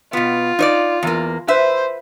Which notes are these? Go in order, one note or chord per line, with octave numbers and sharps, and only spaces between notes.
B2 B3 F4
D#4 C#5 D5
E2 A#3
B4 C5 E5